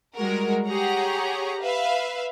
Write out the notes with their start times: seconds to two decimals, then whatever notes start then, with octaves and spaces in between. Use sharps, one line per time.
0.16 G3 G#3 F#4 A#4
0.67 G4 G#4 C#5 F#5 A#5
1.62 B4 E5 F5